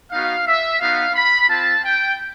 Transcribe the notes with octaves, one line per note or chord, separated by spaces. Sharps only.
B3 D#4 F#4 F5
E5
B3 D#4 F#4 F5
B5
C4 F4 A5
G5